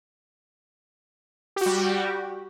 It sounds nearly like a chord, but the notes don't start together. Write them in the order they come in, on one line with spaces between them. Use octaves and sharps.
G4 F#4 G3